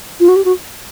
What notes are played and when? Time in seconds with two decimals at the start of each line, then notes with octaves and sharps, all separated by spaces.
0.20 F4
0.28 F#4
0.36 G4
0.45 F#4